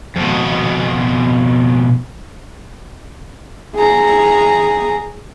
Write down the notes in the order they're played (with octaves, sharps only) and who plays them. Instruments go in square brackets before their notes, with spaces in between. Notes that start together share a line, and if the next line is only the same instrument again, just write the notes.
[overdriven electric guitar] F2 B2
[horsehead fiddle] G#4 A#5